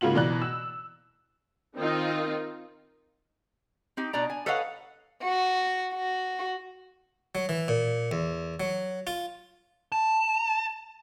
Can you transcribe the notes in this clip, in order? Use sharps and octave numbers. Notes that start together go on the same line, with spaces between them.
G#2 C#3 A#3 F4 F#4 F#7
B2 E3 D5 A#5 F#6
E6
D#3 C4 D#4 F4
C4 D#4 G4
B2 D4 D5 A#5
G#5
A4 B4 C#5 D#5 F5 F#5
F#4
F#4
F#3
E3
A#2
E2
F#3
F4
A5